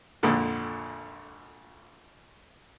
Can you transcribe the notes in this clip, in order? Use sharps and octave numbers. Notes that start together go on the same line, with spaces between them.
G#1 F2 A#2 D3 D#6